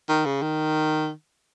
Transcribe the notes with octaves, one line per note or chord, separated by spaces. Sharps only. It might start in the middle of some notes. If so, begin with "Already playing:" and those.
D#3
C#3
D#3